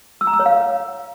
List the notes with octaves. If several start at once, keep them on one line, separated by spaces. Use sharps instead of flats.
E6
A#5
E6
C#5
F5